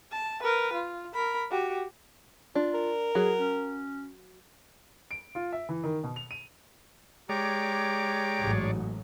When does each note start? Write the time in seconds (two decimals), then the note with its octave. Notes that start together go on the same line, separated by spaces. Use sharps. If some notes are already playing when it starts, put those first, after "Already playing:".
0.11 A5
0.43 A#4 B4
0.73 F4
1.13 A#4 B5
1.51 F#4 G4
2.55 D4 F4
2.74 A#4
3.15 F#3 F#4 G#4
3.40 C#4
5.11 D7
5.35 F4
5.52 E5
5.69 E3
5.84 D#3
6.03 B2
6.16 F7
6.31 D#7
7.29 G#3 G4 C#5 D5 A#5 D6
8.39 A1 G#2 F#3